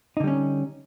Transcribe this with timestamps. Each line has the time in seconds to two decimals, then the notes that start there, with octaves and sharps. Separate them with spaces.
0.17 D#4
0.20 D3
0.24 G3
0.27 C#4